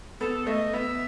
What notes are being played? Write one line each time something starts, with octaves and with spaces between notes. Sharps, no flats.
B3 A4
A3 D#5
B3 E5